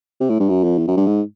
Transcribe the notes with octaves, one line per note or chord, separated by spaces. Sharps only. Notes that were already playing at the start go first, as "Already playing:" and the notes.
C3
A2
G2
F#2
F2
E2
F#2
G2
G#2